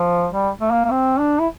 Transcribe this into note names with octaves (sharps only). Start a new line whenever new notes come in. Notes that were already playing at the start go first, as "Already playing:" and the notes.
Already playing: F3
G3
A3
A#3
A#3
C4
D4
E4